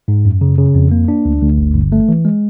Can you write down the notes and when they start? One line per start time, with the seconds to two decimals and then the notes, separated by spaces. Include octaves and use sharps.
0.08 G#2
0.25 F#2
0.41 C#3
0.58 C#3
0.75 F2
0.91 A#3
1.08 D4
1.25 D2
1.41 D2
1.58 G1
1.75 G1
1.92 A3
2.09 E3
2.25 G#3